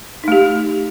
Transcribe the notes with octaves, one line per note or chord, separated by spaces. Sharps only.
A3 D#4 G4